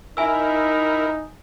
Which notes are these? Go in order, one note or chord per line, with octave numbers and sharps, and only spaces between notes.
D#4 E4 A#4 E5 G#5 E6